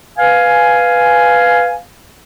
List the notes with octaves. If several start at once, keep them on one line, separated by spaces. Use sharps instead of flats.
B4 F5 G#5